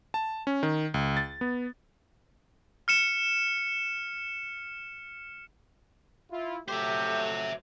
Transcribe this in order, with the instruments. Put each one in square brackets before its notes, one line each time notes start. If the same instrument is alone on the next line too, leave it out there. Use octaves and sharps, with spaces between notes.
[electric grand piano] A5
C#4
D#3
C#2
A6
B3
[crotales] F6 C#7 E7
[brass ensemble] E4 F4
[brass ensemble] F2 F#3 A3 [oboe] G4 [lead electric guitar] C5 E5